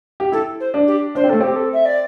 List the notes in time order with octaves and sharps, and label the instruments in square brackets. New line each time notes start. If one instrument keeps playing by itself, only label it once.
[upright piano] G4
[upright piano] E4 [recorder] A4
[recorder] C5
[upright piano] D4
[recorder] G4
[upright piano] D4 [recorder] C5
[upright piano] C4
[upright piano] A3 [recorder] A4
[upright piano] C4 [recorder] G4
[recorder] A4
E5
D5